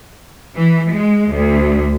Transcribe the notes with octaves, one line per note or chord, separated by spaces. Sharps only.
E3
G#3
D2